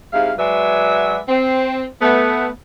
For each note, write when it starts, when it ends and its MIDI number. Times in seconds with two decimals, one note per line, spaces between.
0.13 0.32 44
0.13 0.32 48
0.13 0.32 64
0.13 0.32 77
0.38 1.18 54
0.38 1.18 56
0.38 1.18 66
0.38 1.18 71
0.38 1.18 74
0.38 1.18 76
1.29 1.85 60
2.01 2.47 57
2.01 2.47 59